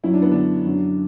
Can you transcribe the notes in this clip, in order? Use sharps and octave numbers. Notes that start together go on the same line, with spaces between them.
F#2 F#3 E4
D4
B3
D3 D4
F#2 D3 F#3